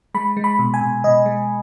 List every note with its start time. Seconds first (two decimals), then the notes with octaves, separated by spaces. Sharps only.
0.14 G#3 B5
0.37 G#3
0.44 B5
0.59 B2
0.74 G#5
0.81 B2
1.04 B2 D#5
1.26 G#3